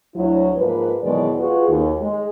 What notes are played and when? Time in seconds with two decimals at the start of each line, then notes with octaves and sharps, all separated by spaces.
0.16 D2 F#3 E4
0.57 G#2 F3 A#3 B4
1.03 E2 B2 D#3 F#3 G#3 D5
1.40 F4 F#4 G#4 B4
1.69 D#2
2.00 G#3